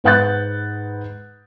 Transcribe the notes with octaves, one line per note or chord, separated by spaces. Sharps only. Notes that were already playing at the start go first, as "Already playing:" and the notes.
G#2 B4 F#5 F#6 G6 A6